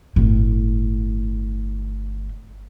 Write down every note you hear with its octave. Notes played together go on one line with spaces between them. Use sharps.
G1 A2